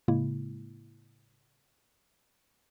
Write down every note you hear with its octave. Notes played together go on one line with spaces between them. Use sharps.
A2 C#3 G#3 A#3 E4